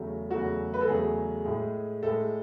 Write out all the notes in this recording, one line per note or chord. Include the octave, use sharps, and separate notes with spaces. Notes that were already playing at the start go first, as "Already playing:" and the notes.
Already playing: E2 C#3 F#3 A3
E2 C#3 F#3 A3 F#4
B4
A4
E2 C#3 F#3 A3 G#4
A2 G#3
A2 G#3 A4